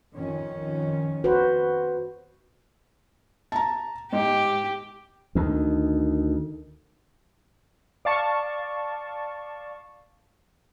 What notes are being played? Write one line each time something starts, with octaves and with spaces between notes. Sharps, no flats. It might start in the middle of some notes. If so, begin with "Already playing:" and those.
F2 D#3 C#4
F#4 B4 C5
A5 A#5
G#2 G4
D2 D#3
D5 F5 A5 C#6